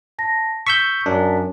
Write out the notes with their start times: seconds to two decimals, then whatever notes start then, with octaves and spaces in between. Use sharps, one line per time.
0.19 A5 A#6
0.67 C#6 E6 G6 B6
1.06 F#2 D4